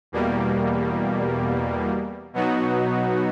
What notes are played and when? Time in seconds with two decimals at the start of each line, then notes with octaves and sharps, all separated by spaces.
0.12 E2 B2 G3 A#3
2.34 B2 F#3 B3 D#4 F#4